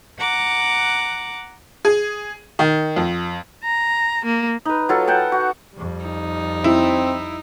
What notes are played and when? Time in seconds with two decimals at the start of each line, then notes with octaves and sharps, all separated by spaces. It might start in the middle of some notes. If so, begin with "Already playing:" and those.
0.19 F#5 A#5 D6 F#6
1.85 G#4
2.59 D#3
2.96 F2
3.64 A#5
4.25 A#3
4.65 D#4 B4
4.89 F#3 F4 A4
5.07 F#5 G5 A5
5.32 F#4
5.74 F2 G3
6.04 D#4
6.64 C4 E4